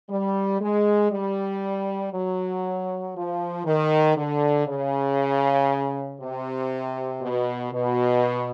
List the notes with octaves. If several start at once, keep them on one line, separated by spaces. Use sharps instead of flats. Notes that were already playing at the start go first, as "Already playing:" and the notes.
G3
G#3
G3
F#3
F3
D#3
D3
C#3
C3
B2
B2